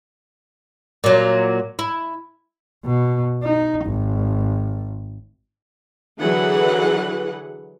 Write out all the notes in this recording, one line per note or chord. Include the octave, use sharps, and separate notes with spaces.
A#2 F#3
E4
B2
D#4
G#1
D3 E3 F#3 G#4 B4 F#5